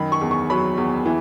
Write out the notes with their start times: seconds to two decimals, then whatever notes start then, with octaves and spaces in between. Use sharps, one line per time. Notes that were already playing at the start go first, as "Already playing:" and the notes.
Already playing: F#2 D#3 B5
0.12 C#6
0.21 E2
0.31 C#6
0.50 F#3 B5
0.77 E2
1.06 E3